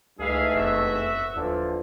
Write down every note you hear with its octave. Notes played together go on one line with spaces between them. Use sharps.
C#2 G#2 E3 A3 G#4 E5 F5
E1 F2 F#4 E5
D#2 D3 E3 F3